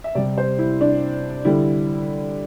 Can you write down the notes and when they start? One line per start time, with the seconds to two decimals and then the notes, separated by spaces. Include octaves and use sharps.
0.04 E5
0.15 C3 G3 D5
0.38 C5
0.59 E4
0.81 D4
1.45 D3 G3 E4